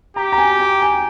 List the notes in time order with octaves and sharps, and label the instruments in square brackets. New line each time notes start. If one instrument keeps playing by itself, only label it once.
[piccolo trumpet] G4 [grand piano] A#5
[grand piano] A#5
G#5
G5
G#5